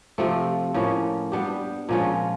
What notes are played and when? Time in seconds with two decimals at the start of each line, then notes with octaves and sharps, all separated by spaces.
0.18 C3 F3 A3 C4
0.74 A2 F3 A#3 C#4
1.32 G3 B3 D4 G4
1.89 A#2 F3 G#3 C#4